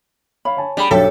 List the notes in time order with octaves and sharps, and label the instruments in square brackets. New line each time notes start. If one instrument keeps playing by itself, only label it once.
[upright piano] C#5 F5 [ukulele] B5
[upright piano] C#5 G#5 A5
[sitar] G3 [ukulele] D4 G#4 B5 [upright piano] D6
[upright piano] B1 G2 [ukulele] G4 C5 E5 [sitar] A4 [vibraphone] C#5